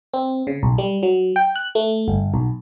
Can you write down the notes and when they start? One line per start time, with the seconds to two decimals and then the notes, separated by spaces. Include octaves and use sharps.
0.14 C4
0.47 C#3
0.63 B1
0.78 G3
1.03 F#3
1.36 G5
1.56 F#6
1.75 A3
2.08 G1
2.34 B1